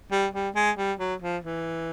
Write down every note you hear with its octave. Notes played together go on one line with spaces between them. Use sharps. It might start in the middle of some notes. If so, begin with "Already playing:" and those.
G3
G3
G#3
G3
F#3
F3
E3